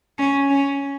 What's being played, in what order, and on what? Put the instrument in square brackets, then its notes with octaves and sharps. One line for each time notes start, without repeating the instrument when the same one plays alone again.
[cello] C#4
C#4